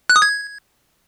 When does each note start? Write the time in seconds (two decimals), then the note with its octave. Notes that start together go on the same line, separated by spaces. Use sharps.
0.10 F#6
0.16 D#6
0.22 G#6